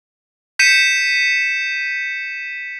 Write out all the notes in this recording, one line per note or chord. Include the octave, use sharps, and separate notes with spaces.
G6 B6 C#7 D#7 E7